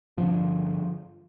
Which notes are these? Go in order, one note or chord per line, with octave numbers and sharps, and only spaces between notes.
G2 D3 F3